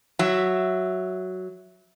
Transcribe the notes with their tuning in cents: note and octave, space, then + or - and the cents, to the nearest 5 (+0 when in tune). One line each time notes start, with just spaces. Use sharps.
F#3 +0 E5 +0